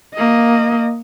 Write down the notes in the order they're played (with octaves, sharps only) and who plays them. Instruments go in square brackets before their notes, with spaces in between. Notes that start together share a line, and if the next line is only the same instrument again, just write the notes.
[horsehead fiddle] A#3 D#5